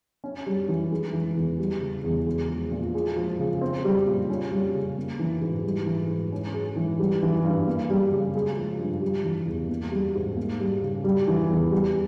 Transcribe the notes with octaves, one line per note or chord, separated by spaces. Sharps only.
C#4
G3
E3
G#3
E3
E2
G3
C#3
E2
G#3
F3
A#2
G#3
F3
C#3
C4
G3
A#2
C#4
G3
C#3
A#3
E3
G#2
G3
E3
G#2
C#4
G#3
E3
G3
E3
G2
A#3
G3
C#3
G#3
F3
G2
G3
E3
E2
A#3
G3
G#2
A#3
G3
C#3
G3
E3
E2
G3